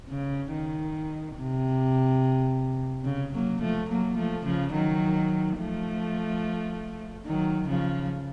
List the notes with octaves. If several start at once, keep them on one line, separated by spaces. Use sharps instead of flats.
C#3
D#3
C3
C#3
F#3 A#3
F3 A3
F#3 A#3
F3 A3
C#3 F3
D#3 F#3
F3 A3
D#3 F#3
C#3 F3